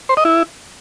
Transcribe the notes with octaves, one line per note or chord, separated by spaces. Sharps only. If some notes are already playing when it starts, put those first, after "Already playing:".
C5
D#5
E4